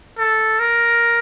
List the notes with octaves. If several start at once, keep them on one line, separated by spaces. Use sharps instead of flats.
A4
A#4